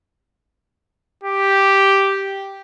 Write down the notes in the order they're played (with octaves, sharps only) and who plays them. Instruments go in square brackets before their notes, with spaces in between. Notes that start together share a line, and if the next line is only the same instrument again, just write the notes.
[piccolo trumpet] G4